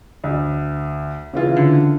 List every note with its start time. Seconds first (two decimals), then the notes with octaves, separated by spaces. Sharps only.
0.24 D2
1.33 C#3 E3 F4
1.57 D3